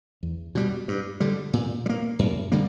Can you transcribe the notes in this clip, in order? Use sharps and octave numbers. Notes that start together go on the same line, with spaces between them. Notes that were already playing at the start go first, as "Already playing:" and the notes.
E2
B2 G3
G2
D3 G3
A#2
G3
A#3
F#2
D3 G3 A#3